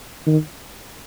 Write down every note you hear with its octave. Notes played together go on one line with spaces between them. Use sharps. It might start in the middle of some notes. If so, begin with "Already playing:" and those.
D#3